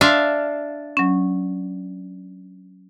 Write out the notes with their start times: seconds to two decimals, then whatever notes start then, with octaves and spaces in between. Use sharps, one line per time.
0.01 D4 E5 F5 C6
0.97 F#3 C#4